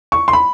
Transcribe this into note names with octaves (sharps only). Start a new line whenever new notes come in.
C#6
C6
B5